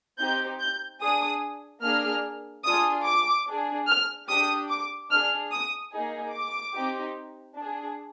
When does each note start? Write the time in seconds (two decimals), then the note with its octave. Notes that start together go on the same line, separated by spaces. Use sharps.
0.18 C4 D#4 G4 G6
0.59 G6
1.00 D4 G#4 D#6
1.82 A#3 D4 G#4 F6
2.64 D4 F4 G#4 D#6
3.05 D6
3.46 D4 G#4
3.87 F6
4.28 D4 G4 D#6
4.70 D6
5.10 D4 G#4 F6
5.51 D#6
5.92 A#3 D#4 G#4
6.33 D6
6.74 C4 D#4 G4
7.56 D4 G#4